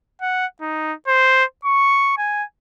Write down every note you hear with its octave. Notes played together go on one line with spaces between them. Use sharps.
F#5
D#4
C5
C#6
G#5